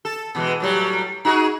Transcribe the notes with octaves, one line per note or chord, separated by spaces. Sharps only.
A4
B2 E3 G#3
A2 F#3 G3
D#4 F#4 G#4